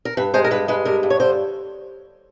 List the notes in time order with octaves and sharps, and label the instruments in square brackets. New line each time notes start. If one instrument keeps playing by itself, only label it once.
[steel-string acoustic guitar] A#4
G2 B4
G#3 C5
A#4
G2 B4
G#3 B4
G2 A#4
G2
C#5
D3 C5